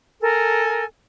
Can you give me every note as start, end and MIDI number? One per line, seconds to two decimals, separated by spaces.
0.20 0.84 69
0.20 0.84 70
0.20 0.84 80